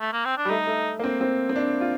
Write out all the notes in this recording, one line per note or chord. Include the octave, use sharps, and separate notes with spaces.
A3
A#3
C4
D4
G3
A3 D#4
A3
A#3
C4
C4
C4
D4
F4